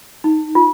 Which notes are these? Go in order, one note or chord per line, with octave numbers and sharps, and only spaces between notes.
D#4
F4